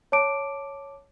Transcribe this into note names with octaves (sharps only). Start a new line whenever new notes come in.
C#5 A5 D6 D7